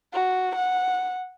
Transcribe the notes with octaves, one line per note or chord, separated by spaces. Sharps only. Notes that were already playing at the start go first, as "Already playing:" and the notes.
F#4
F#5